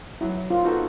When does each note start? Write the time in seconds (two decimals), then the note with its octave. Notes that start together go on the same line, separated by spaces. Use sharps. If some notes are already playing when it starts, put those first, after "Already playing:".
0.21 F#3 E4
0.50 F4
0.64 B3 D#4 F#4 A4